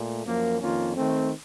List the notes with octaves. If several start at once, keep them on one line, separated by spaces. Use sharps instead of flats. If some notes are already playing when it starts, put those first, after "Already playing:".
Already playing: A#2 A3
F#2 F3 A#3
F2 D#3 A#3 C#4 F4
D#3 A3 C4